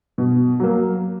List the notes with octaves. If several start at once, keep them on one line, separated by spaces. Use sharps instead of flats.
B2
F#3 A#3